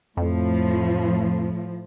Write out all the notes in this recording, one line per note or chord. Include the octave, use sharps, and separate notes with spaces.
F2 A2 F3